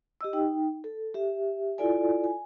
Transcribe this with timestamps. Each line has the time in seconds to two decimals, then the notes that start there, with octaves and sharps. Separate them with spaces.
0.21 G4 D#5 E6
0.33 D#4 G5
0.84 A4
1.14 G4 E5
1.78 E4 F4 A4 D5 G#5
2.24 G#5